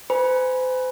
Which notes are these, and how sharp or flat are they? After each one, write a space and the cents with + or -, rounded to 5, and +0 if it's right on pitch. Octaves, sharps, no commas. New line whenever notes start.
C5 -40 G#5 +5 B5 -30